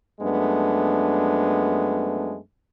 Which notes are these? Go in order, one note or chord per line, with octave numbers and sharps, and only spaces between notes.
F#2 F3 G#3 A3 B3 D4